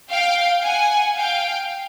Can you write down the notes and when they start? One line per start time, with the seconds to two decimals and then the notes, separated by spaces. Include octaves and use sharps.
0.10 F5 G5
0.63 F#5 G#5
1.16 F5 G5